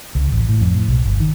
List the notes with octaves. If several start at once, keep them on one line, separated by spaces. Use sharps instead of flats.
C#2
A1
A2
F2
A2
B1
G1
D#3